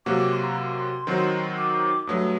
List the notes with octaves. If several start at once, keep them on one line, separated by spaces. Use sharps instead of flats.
C3 F#3 A#3 F#4 D6
D6
C6
A#5
C6
D#3 F#3 C4 D#4 F#4
D6
G2 F#3 A3 D#6